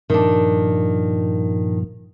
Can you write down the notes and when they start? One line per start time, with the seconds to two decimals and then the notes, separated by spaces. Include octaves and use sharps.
0.10 G2 A#2 D#3 F3 D4